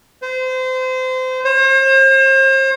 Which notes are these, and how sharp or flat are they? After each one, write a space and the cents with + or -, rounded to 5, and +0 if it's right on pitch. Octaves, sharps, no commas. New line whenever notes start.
C5 -30
C5 +40